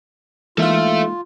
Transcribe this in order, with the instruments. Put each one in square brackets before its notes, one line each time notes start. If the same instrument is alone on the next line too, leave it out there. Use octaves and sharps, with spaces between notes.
[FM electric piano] E3 F5 [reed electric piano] G#3 A#3 D#4 [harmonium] F4 [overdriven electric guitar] A4 E5